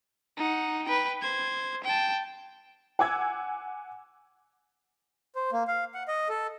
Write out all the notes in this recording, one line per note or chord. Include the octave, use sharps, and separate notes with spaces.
D#4 F#5
B4 G5
C5 G#6
G5 A5
F#5 G#5 D6 E6 G#6
C5
A#3
F5
F#5
D#5
A4